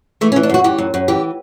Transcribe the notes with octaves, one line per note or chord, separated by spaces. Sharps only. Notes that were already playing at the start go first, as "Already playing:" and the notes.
E3 A3
C#4
E3
D4
F#2 F#4
E3 G4
F#2
F#2
E3 G4